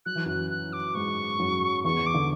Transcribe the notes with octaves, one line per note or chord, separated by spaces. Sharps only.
F#3 F#6
E3
F#2 F#3 F#6
F#6
D6
G#2 G#3 C#6
F#2 F#3
E2 E3 C#6
D6
D3